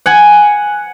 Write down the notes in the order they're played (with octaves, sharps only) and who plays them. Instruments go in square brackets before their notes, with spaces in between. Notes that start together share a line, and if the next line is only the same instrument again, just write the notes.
[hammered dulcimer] F#5 G#5